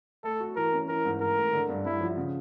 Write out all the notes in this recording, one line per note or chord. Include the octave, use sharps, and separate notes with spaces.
A3 A4
F#4
E3 A#4
C#4
E3 A#4
G#2
G#2 A#4
A3
D3
G2
G2 E4
F3
C#3